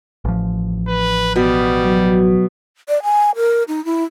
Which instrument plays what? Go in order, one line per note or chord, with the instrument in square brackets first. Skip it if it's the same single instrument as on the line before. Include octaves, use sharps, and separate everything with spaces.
[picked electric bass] A1 F3
[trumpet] B4
[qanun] B2 [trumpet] G3
[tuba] F#3
[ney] D5
G#5
A#4
D#4
E4